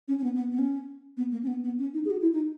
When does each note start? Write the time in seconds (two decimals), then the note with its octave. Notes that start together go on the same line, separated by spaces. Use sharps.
0.08 C#4
0.19 C#4
0.24 B3
0.35 B3
0.52 B3
0.59 C#4
1.17 B3
1.32 A#3
1.43 C#4
1.47 B3
1.64 B3
1.79 C#4
1.94 D#4
2.05 G#4
2.11 F#4
2.21 E4
2.33 D#4